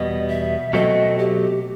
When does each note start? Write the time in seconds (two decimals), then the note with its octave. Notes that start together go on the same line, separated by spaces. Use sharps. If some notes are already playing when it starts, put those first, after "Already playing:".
Already playing: E2 B2 G3 B3 D#5
0.28 E5
0.73 B2 F#3 A3 C4 D#5
1.18 G4